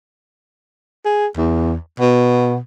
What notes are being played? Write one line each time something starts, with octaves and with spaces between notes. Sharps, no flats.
G#4
E2
B2